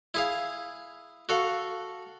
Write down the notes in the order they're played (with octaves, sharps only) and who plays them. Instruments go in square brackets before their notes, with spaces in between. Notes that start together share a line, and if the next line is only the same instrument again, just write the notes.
[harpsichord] E4 G#4 F5
F#4 A4 F5